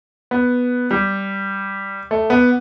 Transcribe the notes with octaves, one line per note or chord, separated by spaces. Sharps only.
B3
G3
A3
B3